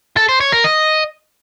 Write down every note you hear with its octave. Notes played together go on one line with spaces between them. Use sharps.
A4
C5
C#5
A#4
D#5